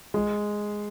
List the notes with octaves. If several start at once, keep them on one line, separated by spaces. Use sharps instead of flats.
G#3